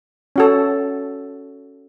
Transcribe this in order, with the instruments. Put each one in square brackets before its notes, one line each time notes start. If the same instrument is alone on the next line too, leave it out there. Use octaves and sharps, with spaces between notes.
[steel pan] C#4 F#4 A4